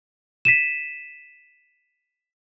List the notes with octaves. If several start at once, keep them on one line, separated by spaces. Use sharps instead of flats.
B6 D#7 E7